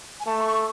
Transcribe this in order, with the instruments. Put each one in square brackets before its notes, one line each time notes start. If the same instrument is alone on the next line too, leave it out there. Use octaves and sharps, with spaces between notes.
[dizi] G#5
[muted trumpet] A3 [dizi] A5
[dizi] C#6